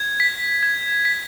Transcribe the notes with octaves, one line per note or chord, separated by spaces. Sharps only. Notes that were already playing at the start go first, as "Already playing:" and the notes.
Already playing: G#6
B6
G#6
B6